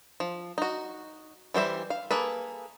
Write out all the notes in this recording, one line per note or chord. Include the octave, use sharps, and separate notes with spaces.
F3
D#4 F#4
E3 G3 C5 E5
F5
A#3 G#4 A4 B4